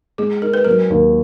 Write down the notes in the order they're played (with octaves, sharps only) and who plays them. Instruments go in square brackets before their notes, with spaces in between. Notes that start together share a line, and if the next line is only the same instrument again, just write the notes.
[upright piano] G#3 [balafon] G#4
[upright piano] D#4 [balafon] A#4
[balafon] B4
[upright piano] F#3 [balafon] A#4
[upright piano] D#2